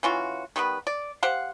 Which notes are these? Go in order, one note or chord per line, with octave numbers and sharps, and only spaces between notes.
E3 C#4 F4 F#4
D#3 G3 B3 B4
D5
G4 C5 F5 F#5